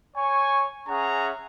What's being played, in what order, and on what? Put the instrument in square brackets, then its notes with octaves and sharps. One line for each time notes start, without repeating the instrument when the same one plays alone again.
[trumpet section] C#5 G#5 C#6
C#4 G#4 E5 F#5 A#5